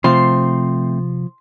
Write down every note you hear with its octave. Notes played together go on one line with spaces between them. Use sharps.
C3 F3 A3 C4 C6